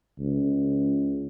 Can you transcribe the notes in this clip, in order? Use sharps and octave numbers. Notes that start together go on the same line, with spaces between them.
C#2